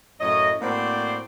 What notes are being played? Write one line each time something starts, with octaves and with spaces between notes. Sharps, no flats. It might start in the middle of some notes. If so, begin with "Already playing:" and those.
F#2 A2 C#5 D#5
A2 A#3 C4 F#4 C5 D5